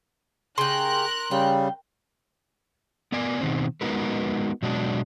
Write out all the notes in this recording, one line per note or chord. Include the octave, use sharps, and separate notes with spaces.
C#3 G4 A#4 C6 F#6
C#3 G3 G5
B3 A#4 D5 G#5
B2 D#3 C4
G#3 B3 D#4 F#4 A#4 B4
B2 F#3 G#3 D4